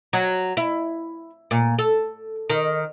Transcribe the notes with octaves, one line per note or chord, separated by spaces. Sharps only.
F#3
E4
A#2
A4
D#3